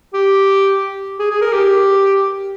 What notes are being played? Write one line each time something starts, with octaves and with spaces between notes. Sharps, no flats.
G4
G#4
G#4
A#4
G4